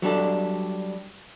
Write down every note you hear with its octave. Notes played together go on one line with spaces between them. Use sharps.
F#3 G3 D4 A4